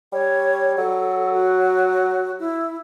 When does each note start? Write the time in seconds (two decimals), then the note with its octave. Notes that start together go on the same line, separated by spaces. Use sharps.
0.13 G3 C#5
0.78 F#3 A4
1.33 F#4
2.39 E4